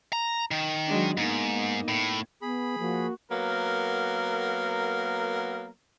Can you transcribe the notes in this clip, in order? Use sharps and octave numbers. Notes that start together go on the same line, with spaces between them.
A#5
D#3
F#3 G#3 D4
G#2 A#3 B3 D#4
A2
B3 G#4 B5
F3 A#3 F#4
F#3 A#3 B3 A#4